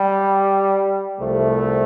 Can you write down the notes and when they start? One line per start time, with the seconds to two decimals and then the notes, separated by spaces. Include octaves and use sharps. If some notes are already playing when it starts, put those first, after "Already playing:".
Already playing: G3
1.20 C2 C3 F3 A3